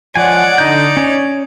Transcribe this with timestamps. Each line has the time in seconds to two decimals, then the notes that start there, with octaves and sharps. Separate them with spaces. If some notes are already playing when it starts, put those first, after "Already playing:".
0.15 F3 G#3 C#5 D5 F#5 G#5
0.58 D3 D#4 G6
0.97 C#4 C#5